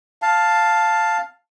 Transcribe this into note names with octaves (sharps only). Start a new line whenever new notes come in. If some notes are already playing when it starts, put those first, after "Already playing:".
F5 A5